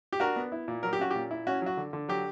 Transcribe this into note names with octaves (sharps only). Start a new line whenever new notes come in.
G4
D4 F#4 A#4
B3
E4
A#2
F#3 A#4
G4
C#4 F#4
A#2 G4
E4
C#4 F#4
F#3 F#4
D3
D3
F#3 G4